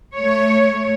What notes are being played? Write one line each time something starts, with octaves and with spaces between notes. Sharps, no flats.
A3 C#5